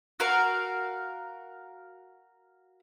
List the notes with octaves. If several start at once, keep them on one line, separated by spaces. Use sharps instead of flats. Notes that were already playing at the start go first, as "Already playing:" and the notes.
F#4 A#4 F5